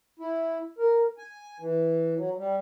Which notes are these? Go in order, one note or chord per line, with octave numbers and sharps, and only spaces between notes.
E4
A#4
G#5
E3
F#3
G3